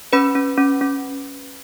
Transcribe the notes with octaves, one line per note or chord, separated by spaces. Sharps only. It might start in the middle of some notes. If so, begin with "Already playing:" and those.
C#4 B4 B5
C#4
C#4
C#4